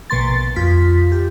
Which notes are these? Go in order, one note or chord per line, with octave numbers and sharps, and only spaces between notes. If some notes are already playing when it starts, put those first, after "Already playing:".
A#1 B2 A#3 C6 A6
F2 F4 B6
G4